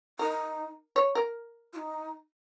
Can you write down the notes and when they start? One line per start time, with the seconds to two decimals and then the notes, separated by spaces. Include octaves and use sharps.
0.19 D#4 A#4
0.96 C#5
1.15 A#4
1.73 F4
1.76 D#4